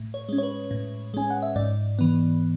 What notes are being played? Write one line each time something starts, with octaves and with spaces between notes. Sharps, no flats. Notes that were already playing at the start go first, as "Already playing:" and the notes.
Already playing: A2
C#5
G#3 C#4
C#5
B4
A2
G#3 C#4 G#5
F#5
E5
G#2 D5
E3 B3